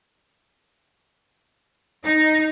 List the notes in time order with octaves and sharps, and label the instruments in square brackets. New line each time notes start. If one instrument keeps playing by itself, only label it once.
[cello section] D#4